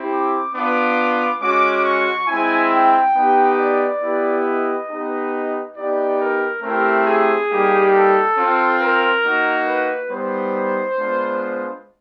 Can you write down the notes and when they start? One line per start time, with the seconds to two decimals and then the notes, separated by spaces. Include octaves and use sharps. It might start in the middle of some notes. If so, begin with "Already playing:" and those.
Already playing: C4 E4 G4
0.11 D6
0.54 B3 D4 F4 D6
1.41 G#3 C#4 F#4 D6
1.84 C#6
2.27 G#3 C4 E4 G#5
2.72 G5
3.15 B3 D#4 G4
3.58 D5
4.02 B3 E4 G4
4.45 D#5
4.89 B3 D#4 G4
5.75 B3 D#4 G4 D5
6.20 A#4
6.62 A3 C4 E4 G4 A#4
7.06 G#4
7.50 G3 A#3 D#4 G4
7.93 A4
8.36 C4 F4
8.80 A#4
9.24 A#3 D#4 F#4
9.67 B4
10.09 G3 B3 D#4 C5
10.97 G#3 B3 D4 F4